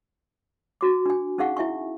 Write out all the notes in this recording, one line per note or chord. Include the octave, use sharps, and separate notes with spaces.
F#4 D6
D4 G#5
C#4 D#4 G#4 F5 F#5 C#6
E4 E5 G#5 C#6